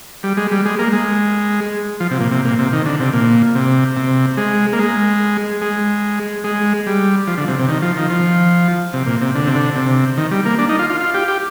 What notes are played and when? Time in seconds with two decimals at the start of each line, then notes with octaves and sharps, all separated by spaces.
0.23 G3
0.37 G#3
0.51 G3
0.66 G#3
0.79 A#3
0.93 G#3
2.00 F3
2.11 C3
2.20 A#2
2.31 C3
2.45 A#2
2.59 C3
2.73 D#3
2.86 D3
3.00 C3
3.13 A#2
3.55 C3
3.97 C3
4.37 G#3
4.73 A#3
4.79 G#3
5.61 G#3
6.44 G#3
6.87 G3
7.27 F3
7.38 D3
7.48 C3
7.59 C3
7.68 D#3
7.82 F3
7.97 D#3
8.10 F3
8.93 C3
9.06 A#2
9.21 C3
9.35 D3
9.47 C3
9.55 D3
9.76 C3
10.17 D#3
10.31 G3
10.45 A#3
10.58 D4
10.69 D#4
10.79 F4
10.90 F4
11.01 F4
11.14 G4
11.28 G4